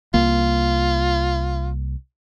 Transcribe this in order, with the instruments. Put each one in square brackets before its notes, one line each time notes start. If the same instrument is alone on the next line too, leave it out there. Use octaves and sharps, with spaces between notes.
[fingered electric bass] C2 A#3 [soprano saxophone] F4